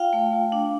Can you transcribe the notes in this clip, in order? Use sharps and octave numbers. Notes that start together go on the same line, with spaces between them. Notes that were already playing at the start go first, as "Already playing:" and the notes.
Already playing: F4 F5 G5
A3
F4
D4